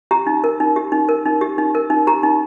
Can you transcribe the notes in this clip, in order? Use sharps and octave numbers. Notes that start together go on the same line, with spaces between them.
G4 A#5
D#4
A#4
D#4
G4
D#4
A#4
D#4
G4
D#4
A#4
D#4
G4 A#5
D#4